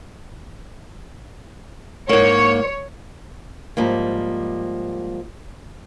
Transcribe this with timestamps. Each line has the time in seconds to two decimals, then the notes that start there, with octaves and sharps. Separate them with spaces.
2.09 G#2 A#3 C#5
3.77 G#2 F3 G3 A#3